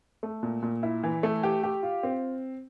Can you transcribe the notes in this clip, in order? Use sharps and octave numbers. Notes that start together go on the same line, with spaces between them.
A3
A#2
A#2
E4
E3
A3
G4
G4
F4
C4